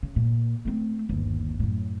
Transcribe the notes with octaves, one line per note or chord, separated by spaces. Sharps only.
C#3
A#2
A3 C4
G1 D#2
F#2 A2